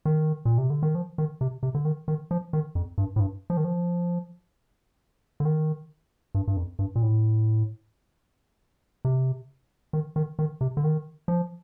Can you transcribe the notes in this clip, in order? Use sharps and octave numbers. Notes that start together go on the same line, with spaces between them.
D#3
A#2
C3
D3
D#3
F3
D#3
C3
C3
D3
D#3
D#3
F3
D#3
F2
G2
A2
G2
F3
D#3
F3
D3
D#3
G2
G2
F2
G2
A#2
A2
C3
D#3
D#3
D#3
C3
D3
D#3
F3